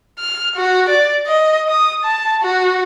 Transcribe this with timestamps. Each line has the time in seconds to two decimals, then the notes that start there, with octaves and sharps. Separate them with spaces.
0.19 F6
0.56 F#4
0.89 D5
1.27 D#5
1.69 D#6
2.04 A5
2.42 F#4